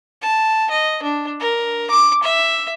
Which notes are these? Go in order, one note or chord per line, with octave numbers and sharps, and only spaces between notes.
A5
D#5
D4
A#4
D6
E5